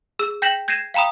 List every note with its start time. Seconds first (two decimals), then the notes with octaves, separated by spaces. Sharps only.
0.19 G#4 E6
0.42 G5 G6 A#6 B6 E7 F#7
0.68 G6 G#6 A#6 C7 D#7 E7
0.94 F5 G5 A#5 B5 D#6